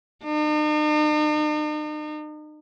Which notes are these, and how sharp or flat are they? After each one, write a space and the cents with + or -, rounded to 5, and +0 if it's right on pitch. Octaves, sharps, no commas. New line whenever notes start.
D#4 -45